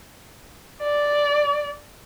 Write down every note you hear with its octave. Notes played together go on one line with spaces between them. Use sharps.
D5